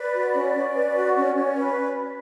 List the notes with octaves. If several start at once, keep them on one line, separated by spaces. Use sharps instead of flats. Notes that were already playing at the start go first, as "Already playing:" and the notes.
Already playing: B4 D5
F#4
C#4
C#4
B4
F#4
C#4
C#4
B4